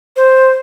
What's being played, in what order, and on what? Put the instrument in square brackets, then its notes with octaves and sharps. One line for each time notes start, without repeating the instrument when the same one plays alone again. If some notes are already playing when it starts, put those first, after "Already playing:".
[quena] C5